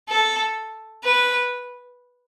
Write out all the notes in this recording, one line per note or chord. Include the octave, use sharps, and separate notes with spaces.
A4
B4